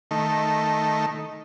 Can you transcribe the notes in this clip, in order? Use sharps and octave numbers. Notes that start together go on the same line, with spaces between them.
D#3 A3